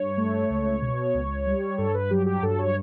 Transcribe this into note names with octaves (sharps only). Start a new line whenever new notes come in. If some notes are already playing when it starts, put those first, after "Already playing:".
Already playing: G2 C#5
A3
C#2
B2
C#2
G3
G2 A4
B4
F#3 G4
G4
G2 A4
C#5